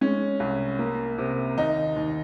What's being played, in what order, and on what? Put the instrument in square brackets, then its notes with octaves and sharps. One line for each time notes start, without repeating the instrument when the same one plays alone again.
[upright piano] G#3 C#4
C2
A#3
C3
D#2 D#4
D#2